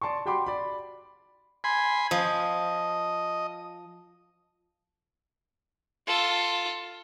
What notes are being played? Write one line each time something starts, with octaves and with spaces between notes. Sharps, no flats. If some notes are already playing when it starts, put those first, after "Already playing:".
D5 A5 C6 C#6
F#4 G4 G5 B5 C6 D6
D5 B5
G#5 B5 C6
F3 D#5
F4 A4